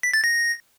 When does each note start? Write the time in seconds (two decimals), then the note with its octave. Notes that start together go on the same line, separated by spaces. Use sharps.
0.03 B6
0.14 A6
0.24 A#6